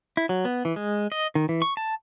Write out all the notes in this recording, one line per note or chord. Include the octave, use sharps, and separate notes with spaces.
E4
F#3
B3
E3
G#3
D#5
D#3
E3
C#6
A5